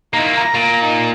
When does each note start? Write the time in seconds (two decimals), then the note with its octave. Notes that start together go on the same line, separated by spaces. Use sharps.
0.14 A#3 D#4 E4
0.37 A#5
0.55 A#2
0.82 D#4